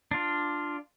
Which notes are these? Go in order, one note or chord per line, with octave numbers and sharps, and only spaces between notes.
D4 F4